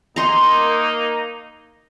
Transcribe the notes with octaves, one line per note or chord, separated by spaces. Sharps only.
A#3 D#4 A#5 C6